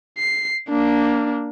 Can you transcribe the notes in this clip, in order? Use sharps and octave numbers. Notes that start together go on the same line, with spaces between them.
C7
A#3 D4